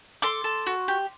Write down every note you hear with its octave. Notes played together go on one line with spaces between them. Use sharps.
A4 C6 D6
A4
F#4
G4